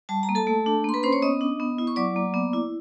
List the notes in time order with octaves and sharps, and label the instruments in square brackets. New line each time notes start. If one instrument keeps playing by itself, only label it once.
[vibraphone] G3 A5
A#5
A#3
A4 A5
A3
D4
A#3 C6
B4 B5
C#4 C5 C6
C#5 C#6
B3 D#5 D#6
D4
B3
E4
C#6
F#3 D5 D6
A#3
B3
E4